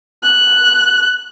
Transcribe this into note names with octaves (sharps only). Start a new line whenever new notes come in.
F#6